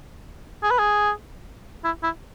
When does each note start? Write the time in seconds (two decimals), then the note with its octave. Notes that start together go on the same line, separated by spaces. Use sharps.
0.63 G#4
0.71 B4
0.79 G#4
1.85 E4
2.03 E4